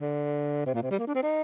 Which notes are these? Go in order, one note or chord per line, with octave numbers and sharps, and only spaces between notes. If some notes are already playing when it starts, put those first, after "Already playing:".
D3
C3
A#2
C3
G3
A#3
D4
C4
D#4